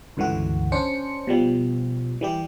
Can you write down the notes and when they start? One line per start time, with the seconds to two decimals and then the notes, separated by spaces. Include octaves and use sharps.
0.17 C#2 G2 D3 E3 F#4
0.72 C#4 D4 C5 C#7
1.27 B2 F3 G3
2.21 E3 G3 G4